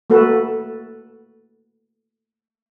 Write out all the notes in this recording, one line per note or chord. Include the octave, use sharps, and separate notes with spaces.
A3 A#3 F#4 A4 B4